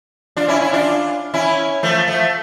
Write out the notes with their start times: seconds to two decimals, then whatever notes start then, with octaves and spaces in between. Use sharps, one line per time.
0.37 D4 F4
0.48 C#4 E4
0.60 C#4 E4
0.73 D4 F4
1.34 C#4 E4
1.83 F3 A3
2.08 F3 A3